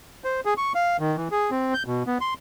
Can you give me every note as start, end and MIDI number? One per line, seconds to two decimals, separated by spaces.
0.24 0.41 72
0.45 0.54 68
0.57 0.73 85
0.75 0.97 77
0.99 1.16 51
1.17 1.28 52
1.31 1.50 68
1.51 1.74 60
1.74 1.83 91
1.87 2.03 47
2.07 2.18 59
2.21 2.34 84